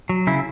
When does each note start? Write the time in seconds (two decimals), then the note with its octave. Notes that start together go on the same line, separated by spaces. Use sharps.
0.09 F#3
0.27 C#3 E4